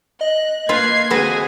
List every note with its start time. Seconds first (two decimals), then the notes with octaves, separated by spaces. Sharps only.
0.21 D#5 F#6
0.69 A#3 F4 B4 G#6 C7
1.10 D3 G#3 C4 F#4 G#4 B4 G#5